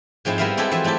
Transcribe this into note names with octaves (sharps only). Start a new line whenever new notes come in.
G#2 F3 G#3 C4 E4
G3 B3 E4 A#4 E5 F5
G#3 C4 E4 G4 A4 B4
E3 F3 C5 E5
F#3 A3 E4 G4 A4